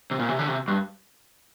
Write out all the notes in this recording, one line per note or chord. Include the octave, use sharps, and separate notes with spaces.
C3
A#2
C3
D3
C3
G2